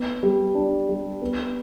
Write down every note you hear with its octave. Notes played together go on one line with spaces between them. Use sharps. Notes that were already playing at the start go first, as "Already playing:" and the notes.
Already playing: B3
G3
D4
G3
B3